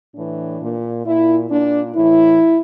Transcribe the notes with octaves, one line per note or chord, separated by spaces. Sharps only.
A2 E3 D4
A#2
A#2 E4
A#2 D4
A2 E3 E4